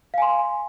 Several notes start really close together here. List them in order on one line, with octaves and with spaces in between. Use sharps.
F5 G#5 C6